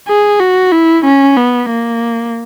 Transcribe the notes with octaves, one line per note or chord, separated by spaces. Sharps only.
G#4
F#4
E4
C#4
B3
A#3